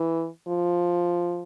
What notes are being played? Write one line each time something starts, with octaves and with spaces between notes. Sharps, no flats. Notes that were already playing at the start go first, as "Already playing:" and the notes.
Already playing: E3
F3